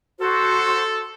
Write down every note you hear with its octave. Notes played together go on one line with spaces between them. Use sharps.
F#4 A4 C5